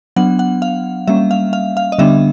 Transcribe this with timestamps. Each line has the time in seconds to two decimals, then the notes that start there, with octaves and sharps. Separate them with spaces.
0.16 F#3 B3 D4 F#5
0.39 F#5
0.62 F5
1.08 G3 A#3 C#4 E5
1.31 F5
1.53 F5
1.77 F5
1.92 D#5
1.98 D3 G3 B3 D4 E5